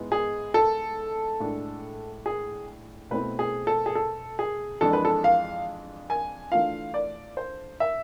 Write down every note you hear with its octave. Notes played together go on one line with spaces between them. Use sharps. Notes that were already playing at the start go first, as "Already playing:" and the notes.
Already playing: G#2 G#3 B3 E4
G#4
A4
A2 G#3 D4
G#4
B2 A3 C4 E4 B4
G#4
A4
G#4
A4
G#4
F2 E3 G#3 D4 A4
B4
A4
F5
G#5
E3 A3 D4 F4 F5
D5
C5
E5